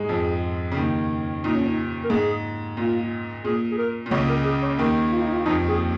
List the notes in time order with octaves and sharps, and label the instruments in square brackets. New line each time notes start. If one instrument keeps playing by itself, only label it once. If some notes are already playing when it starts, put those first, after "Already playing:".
Already playing: [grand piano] G#2 G#3 [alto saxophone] G#4
[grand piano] F2 F3
C#3
D#2 D#3
[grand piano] A#2 [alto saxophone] D#4
[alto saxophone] C#4
D#4
A#4
[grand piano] G#2 [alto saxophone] G#4
[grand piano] A#2 [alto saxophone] F4
[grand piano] A#2 [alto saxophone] G#4
[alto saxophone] G#4
A#4
[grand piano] A#2
[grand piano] C#2 C#3 [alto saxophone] C#5
[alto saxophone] A#4
G#4
C#5
[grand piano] D#2 D#3 [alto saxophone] A#4
[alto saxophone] F4
D#4
F4
[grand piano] F2 F3 [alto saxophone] D#4
[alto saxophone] G#4